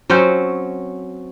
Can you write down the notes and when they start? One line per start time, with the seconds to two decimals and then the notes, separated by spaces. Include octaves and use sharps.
0.10 F#3 C4 C#4 C5